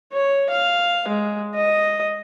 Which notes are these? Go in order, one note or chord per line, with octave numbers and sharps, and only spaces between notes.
C#5
F5
G#3
D#5